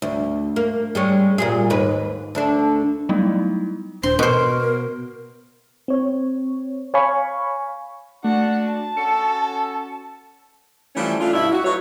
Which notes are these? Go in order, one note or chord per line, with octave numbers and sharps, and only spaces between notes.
D2
A#3
G3 G#3 C#4
A#2 G3 G#4
D#2 G#2 B4
D2 D3 D4
F#3 G3 A3 B3 D#4 E4
D#1 D4 C5 C6
B2 B3 A#4 C5
C4 C#5
C#5 F5 G#5 B5 C#6
A3 D4 F#4 F#5
A5
C#4 F#4 A4 C#7
E3 F3 G3 A3 C#4
A3 D4 F4
G2 B2 E4
F#4
F#3 A3 B4 C#5